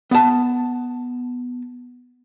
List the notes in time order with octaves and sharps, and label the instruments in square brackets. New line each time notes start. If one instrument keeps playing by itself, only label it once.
[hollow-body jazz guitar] B3 A5